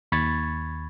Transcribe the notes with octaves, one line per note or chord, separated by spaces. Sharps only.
D#2 B5 C#6 G#6 A6